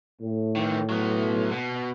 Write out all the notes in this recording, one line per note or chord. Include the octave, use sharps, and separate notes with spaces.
A2
D#3 E3
F#3 B3
B2